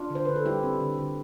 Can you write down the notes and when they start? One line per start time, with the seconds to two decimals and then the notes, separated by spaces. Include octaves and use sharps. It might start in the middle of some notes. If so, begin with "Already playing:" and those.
Already playing: D4 F4
0.10 D3
0.15 C5
0.25 D3 B4
0.36 A4
0.46 G3 E4 G4
0.63 C4
0.80 D3
0.98 D3